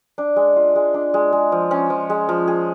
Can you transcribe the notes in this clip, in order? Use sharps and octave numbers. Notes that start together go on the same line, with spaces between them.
D4
G#3
F4
G#3
D4
G#3
G#3
F3
C#4
F3
G#3
F3
G#4